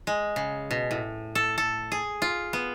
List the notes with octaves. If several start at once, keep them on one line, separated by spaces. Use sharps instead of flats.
G#3
C#3
B2
A2
A4
A4
G#4
F4
B3